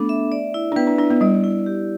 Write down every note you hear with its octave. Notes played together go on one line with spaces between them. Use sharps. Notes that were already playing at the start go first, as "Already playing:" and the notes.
Already playing: A3 B3 D4 A4
E5
D5
E4
D4
B3 B4
D4
D4 E4
B3
G3 D5
E4
G4